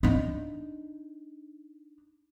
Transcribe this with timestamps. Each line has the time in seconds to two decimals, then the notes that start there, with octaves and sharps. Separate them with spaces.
0.03 D4 D#4